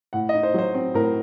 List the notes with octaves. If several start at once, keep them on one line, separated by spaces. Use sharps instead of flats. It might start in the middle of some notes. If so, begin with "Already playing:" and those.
A2 F#5
D#5
D#4
C5
F#3 C5
C4
A2 A#4